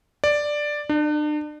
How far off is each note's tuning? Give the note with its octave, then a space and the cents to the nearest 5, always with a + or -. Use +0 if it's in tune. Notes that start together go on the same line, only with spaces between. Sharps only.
D5 +5
D4 +40